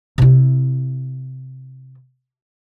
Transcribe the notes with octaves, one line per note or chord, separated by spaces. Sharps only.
C3 E4